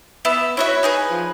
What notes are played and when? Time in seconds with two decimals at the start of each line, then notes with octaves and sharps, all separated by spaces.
0.25 B3 E5
0.57 E4 F#4 C#5 E5
0.83 D#4 G#4 B4
1.10 F3